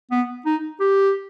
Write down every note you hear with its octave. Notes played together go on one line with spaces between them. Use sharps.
B3
D#4
G4